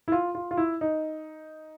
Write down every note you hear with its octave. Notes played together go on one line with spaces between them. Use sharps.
E4
F4
F4
F4
E4
D#4